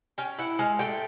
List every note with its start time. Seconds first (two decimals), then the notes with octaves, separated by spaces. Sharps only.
0.18 C#4 G5
0.38 E4 F#5
0.59 G#3 F5
0.79 A3 G5